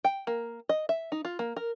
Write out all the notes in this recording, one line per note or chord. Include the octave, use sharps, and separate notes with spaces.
G5
A#3
D#5
E5
D#4
F4
A#3
A#4